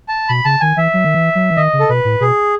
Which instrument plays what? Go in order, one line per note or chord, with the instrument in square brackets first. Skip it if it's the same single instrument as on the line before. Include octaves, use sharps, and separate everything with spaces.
[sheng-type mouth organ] A5
[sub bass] B2 [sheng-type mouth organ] B5
[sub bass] C#3 [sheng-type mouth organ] A5
[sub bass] D#3 [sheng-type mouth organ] G#5
[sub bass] E3 [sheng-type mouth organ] E5
[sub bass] F#3
D#3
E3
F#3
E3
[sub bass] D#3 [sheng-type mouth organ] D#5
[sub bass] C#3
[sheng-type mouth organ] A4
[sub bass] B2 [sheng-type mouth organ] B4
[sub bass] A2
[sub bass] B2 [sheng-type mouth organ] G#4